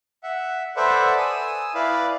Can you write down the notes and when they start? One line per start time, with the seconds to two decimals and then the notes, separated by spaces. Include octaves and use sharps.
0.23 E5 F#5
0.76 A4 B4 C5 D5 E5 F#5
1.18 G#5 D#6 E6
1.75 E4 B4 D5 F5